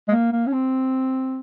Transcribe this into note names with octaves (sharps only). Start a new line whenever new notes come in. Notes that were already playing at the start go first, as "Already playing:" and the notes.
G#3
A#3
A#3
C#4
C4